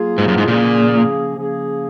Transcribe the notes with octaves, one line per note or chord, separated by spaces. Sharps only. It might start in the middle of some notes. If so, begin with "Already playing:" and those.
Already playing: F#3 A#3 F4 G#4
G#2
F#2
G#2
A#2 C#3 F3 A#3 C#4 G#4
C#3 F3 A#3 C#4 G#4